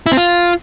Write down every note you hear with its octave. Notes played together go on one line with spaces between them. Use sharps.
E4
C4
F4